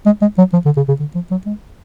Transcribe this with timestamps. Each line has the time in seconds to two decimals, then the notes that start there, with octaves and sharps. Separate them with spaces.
0.06 G#3
0.21 G#3
0.38 F#3
0.53 F3
0.65 D3
0.77 C#3
0.88 C#3
1.00 D3
1.15 F3
1.31 F#3
1.46 G#3